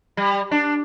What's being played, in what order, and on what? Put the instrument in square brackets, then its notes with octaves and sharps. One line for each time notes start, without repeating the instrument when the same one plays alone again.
[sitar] G3
D4